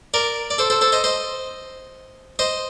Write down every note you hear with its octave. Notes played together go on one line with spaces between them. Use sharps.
A#4 D5
D5
A4 C5
A4 C5
A4 C5
C5 D#5
C5 D#5
C5 D#5